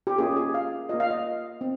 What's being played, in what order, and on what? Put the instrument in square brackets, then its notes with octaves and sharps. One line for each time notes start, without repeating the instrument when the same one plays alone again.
[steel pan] G4
A#3 C#4 F4 G#4
G#4
F5
A#3 F4 D#5
F5
D#5
C4